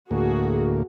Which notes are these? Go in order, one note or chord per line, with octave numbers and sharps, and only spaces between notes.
D2 A2 A#3 F#4 G#4